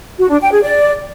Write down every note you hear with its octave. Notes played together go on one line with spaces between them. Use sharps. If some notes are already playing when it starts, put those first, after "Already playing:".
F#4
D4
G5
G#4
D5